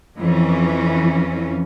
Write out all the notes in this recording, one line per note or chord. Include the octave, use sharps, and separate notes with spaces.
F2 E3 C#4